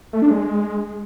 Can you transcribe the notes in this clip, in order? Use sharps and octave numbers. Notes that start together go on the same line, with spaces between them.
A3
D4
G#3